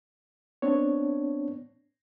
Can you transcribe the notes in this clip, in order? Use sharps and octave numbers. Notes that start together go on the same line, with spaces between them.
B3 C4 D4 C#5